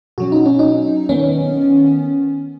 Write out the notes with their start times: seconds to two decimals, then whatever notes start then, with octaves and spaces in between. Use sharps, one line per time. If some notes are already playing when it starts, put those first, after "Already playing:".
0.18 B2 F#3 C#4 F#4
0.32 D#4
0.46 C#4
0.59 D#4
1.09 D#3 B3 C#4